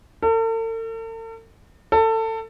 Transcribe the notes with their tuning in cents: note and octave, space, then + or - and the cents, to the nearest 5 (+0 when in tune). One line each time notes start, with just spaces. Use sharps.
A4 +45
A4 +25